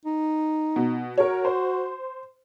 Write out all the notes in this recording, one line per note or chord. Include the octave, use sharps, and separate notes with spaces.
D#4
B2
F#4 A#4 C#5
C5